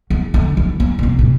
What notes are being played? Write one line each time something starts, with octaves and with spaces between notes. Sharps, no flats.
E2
D3
E3
E3
A#2
C3
A2